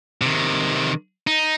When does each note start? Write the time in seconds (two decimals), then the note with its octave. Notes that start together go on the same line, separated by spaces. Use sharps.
0.21 C3 D#3
1.27 D#4